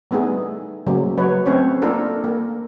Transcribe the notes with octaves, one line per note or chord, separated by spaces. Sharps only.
G3 A3 B3 D#4 G#4
C#3 F#3 A3 A#3
F#3 B4 C#5
A3 C4 C#4 C5 C#5
A#3 D4 F4 A4 A#4
A#3